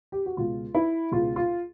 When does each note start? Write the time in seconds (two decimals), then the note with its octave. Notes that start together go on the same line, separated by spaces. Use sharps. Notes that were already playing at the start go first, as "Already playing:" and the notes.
0.12 G4
0.26 F#4
0.37 C#2 B2 G#3 F4
0.75 E4
1.11 C#2 B2 G#3 F4
1.36 F4